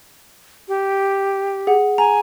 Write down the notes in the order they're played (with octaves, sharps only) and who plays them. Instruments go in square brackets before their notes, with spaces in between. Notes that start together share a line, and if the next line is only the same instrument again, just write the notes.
[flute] G4
[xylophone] G#4 F#5
[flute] G#5 [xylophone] A#5